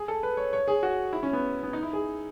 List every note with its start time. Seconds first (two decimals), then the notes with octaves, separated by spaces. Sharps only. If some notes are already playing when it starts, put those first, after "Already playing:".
Already playing: G#4
0.08 A4
0.23 B4
0.37 C#5
0.53 C#5
0.68 G#4
0.83 F#4
1.13 E4
1.23 C#4
1.33 B3
1.63 B3
1.73 D#4
1.83 E4
1.93 G#4